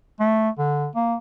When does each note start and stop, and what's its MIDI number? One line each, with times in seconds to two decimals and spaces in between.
0.20 0.49 57
0.58 0.87 50
0.95 1.16 58